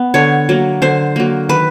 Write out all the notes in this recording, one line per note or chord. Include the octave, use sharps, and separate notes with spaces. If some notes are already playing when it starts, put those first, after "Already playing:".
Already playing: B3
D3 C#5
F#3 A#3
D3 C5
F#3 A#3
D#3 B4